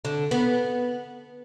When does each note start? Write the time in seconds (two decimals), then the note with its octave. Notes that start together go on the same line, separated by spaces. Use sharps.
0.05 D3
0.31 B3